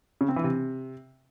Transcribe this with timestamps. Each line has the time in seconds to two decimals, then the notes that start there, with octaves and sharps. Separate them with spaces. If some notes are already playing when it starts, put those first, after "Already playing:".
0.21 C#3
0.28 C4
0.36 E3
0.44 C3